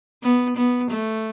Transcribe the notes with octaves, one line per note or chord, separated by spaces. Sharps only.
B3
B3
A3